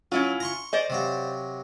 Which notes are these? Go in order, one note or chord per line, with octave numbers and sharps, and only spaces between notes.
F#3 C#4 E4 F4
A#5 C6 C#6
C5 D5 D#5
C3 F#3 F5